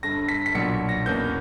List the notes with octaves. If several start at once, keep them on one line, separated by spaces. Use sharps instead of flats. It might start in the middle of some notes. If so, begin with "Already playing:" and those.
G1 G2 D3 A#6
B6
B6
B1 A#2 F#3 B3 D4 C#7
A#6
E2 B2 A#3 C#4 G6